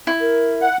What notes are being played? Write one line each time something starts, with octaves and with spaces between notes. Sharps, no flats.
E4
A#4
F#5